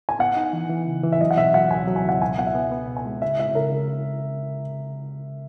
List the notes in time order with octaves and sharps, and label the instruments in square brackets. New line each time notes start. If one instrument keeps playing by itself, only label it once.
[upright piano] G#5
[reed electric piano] B3 [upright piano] F#5
[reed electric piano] D#4
E3
E3
C#3
E3
[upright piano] E5
[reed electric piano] F#3 [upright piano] D#5
[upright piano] F#5
[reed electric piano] B2 [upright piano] E5
[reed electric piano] F#3 [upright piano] F#5
[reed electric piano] C#2 [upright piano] G#5
[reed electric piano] F#3
[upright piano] G#5
[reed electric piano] C#2 [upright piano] F#5
[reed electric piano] B2 [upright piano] G#5
[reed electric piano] B3 [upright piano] F#5
[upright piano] E5
[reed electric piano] B3
B3
B2
[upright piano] G#5
[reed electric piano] G#3
[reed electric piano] C#3 [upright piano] E5
[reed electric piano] G#3 [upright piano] E5
[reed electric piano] C#3 [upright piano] A#4
[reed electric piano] C#3